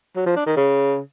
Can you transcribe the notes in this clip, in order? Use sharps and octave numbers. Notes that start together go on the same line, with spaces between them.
F#3
F3
D4
D#3
C#3